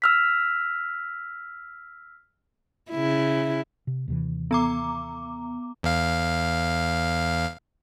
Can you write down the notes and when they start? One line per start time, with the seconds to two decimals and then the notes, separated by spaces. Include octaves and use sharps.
0.02 E6 F6 B6
2.91 C#3 E4
3.87 C3
4.08 D#2 C3 E3
4.51 B3 A#5 D6
5.83 E2 F5